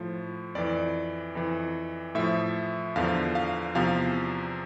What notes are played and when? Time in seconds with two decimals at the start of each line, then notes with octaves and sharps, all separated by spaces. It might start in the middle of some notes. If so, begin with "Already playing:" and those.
Already playing: A2 F3
0.55 F2 E3 D5
1.35 F2 E3
2.15 A2 F3 E5
2.96 E2 D3 F3 F5
3.35 F5
3.75 E2 C3 F3 F5